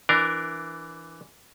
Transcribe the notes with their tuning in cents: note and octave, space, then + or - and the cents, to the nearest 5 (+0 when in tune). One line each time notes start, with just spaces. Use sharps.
E3 +10 D4 +0 A#4 +0